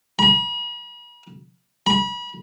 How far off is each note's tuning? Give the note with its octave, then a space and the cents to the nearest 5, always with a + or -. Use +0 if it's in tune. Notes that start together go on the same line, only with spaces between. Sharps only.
B5 -45
B5 -35